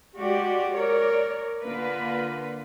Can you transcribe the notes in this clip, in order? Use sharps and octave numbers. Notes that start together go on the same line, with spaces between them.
G#3 F#4 G4 D5
A#4 C#5 D5
D3 A#3 F4 B4